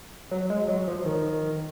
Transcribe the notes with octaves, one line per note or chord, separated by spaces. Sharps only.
F#3
G#3
F#3
F3
D#3